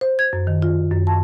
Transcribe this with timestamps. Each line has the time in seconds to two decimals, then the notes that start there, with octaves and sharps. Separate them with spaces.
0.01 C5
0.19 G#6
0.33 F#2
0.47 D#3
0.62 F4
0.91 F#2
1.07 A5